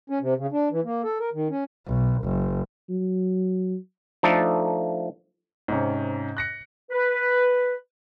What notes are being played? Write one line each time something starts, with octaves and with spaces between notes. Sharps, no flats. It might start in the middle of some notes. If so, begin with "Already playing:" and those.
C#4
C3
C#3
D4
E3
A#3
A4
A#4
D#3
C#4
B1
F#1
F#3
F3 A3 D4 D#4 A4
G#2 C3 C#4
F#6 A#6 C#7
B4